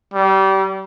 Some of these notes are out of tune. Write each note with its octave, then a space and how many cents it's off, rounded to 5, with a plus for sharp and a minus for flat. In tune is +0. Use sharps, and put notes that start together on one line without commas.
G3 -30